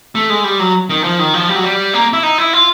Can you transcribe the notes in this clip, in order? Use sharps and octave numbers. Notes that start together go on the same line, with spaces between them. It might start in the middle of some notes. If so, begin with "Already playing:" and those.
A3
G#3
G3
F#3
D#3
F3
D#3
F3
G3
F#3
G3
A#3
E4
D#4
E4
F4